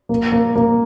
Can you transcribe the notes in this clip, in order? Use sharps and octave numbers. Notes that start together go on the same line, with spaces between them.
A#3
A#3
A#3